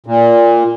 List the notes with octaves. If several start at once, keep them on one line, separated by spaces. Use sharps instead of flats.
A#2